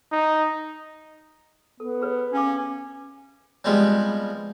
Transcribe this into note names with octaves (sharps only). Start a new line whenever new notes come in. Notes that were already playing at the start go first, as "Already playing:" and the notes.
D#4
B3 A4
G#4 B4 C#5
C#4 G4 F5 D6
F3 G3 G#3 B3 C4